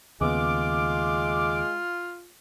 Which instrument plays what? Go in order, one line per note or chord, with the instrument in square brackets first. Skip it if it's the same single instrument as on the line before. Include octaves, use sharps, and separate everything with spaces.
[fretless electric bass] D#2 C#3 B3 [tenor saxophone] G#3 [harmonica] F4 [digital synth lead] D6